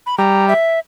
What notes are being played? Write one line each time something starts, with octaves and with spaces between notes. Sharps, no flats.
B5
G3 A#5
E5